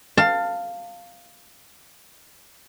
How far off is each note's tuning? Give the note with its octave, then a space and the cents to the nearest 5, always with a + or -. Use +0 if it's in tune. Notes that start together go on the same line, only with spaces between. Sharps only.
F5 +0 A5 +25